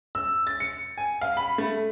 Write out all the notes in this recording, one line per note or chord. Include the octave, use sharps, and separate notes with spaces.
E6
A6
C#7
G#5
F5
B5
A3